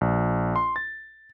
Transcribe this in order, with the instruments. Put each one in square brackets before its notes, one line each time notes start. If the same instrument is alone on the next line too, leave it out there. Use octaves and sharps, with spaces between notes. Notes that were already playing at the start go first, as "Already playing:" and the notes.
[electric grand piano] A#1
C6
A6